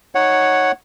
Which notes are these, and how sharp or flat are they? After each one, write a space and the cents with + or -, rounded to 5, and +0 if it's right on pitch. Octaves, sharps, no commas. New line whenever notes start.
D#4 +0 C#5 -5 F#5 +0